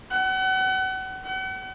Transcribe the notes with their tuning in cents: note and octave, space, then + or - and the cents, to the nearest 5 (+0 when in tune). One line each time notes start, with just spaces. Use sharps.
F#5 +35
F#5 +40